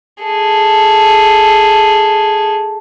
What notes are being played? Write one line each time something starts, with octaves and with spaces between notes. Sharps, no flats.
G#4 A4